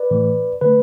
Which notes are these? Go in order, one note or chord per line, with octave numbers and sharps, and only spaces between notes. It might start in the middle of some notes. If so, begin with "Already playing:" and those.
Already playing: B4 D5
A2 E3 A3
D3 A3 B4